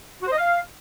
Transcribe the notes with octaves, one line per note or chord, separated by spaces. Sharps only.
F#4
C5
D#5
F5